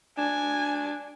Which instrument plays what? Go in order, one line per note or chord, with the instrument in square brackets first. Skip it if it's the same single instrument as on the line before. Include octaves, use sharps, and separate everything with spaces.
[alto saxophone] D4 [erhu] G#5